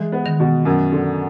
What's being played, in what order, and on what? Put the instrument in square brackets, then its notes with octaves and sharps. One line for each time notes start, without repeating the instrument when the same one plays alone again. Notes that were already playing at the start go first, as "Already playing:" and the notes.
Already playing: [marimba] E3 [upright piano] G#3
[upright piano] B3
[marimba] D#3
[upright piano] B2
F#2
D3